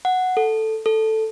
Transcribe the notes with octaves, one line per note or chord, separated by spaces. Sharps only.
F#5
A4
A4